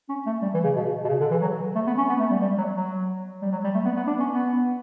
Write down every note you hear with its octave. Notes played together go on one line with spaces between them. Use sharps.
C#4
A3
G3
E3
C#3
B2
B2
C#3
D3
E3
F#3
A3
B3
C#4
B3
A3
G3
G3
F#3
F#3
G3
F#3
G3
A3
B3
B3
D4
C#4
B3